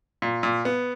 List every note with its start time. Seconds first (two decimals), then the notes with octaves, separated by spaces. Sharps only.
0.22 A#2
0.43 A#2
0.65 B3